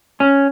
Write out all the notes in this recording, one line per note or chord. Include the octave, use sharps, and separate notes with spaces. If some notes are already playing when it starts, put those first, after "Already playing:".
C#4